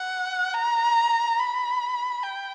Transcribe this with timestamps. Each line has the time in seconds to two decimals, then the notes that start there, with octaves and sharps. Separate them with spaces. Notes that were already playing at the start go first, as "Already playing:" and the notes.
Already playing: F#5
0.54 A#5
1.39 B5
2.23 G5